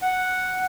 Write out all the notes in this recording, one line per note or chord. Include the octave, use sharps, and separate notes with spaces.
F#5